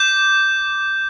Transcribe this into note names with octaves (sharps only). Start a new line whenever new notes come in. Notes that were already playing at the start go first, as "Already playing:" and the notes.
Already playing: D6 G6